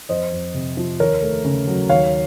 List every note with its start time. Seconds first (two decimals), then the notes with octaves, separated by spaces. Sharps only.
0.09 F2 C5 D#5
0.32 F2
0.54 C3
0.77 F3
0.99 D#2 A#4 C#5
1.22 A3
1.45 C#3
1.68 F#3
1.89 D#2 C#5 F5